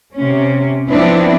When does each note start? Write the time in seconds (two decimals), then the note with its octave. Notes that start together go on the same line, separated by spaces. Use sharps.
0.15 C3 C#4
0.90 F3 B3 C4 D4 E4 B4